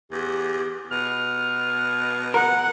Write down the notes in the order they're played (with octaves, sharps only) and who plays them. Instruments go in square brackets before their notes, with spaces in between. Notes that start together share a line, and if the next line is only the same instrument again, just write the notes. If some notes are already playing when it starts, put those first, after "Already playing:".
[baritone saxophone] E2 [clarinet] G4
[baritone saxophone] B2 [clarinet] F6
[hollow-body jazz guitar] A#4 [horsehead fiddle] F#5